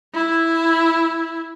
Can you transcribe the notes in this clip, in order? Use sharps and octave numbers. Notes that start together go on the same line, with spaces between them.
E4